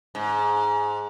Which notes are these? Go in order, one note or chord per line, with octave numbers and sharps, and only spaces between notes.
G#2